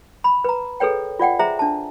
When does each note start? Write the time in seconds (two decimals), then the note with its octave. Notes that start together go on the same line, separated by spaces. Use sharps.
0.24 B5
0.44 B4 A#5
0.80 G#4 A4 B4 C#5 G5
1.19 F4 D5 F#5 G5
1.39 G#4 C5 E5 A#5
1.59 D4 A5